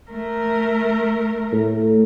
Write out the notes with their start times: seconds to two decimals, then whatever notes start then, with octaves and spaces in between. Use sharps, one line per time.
0.11 A3 A#4
1.52 A2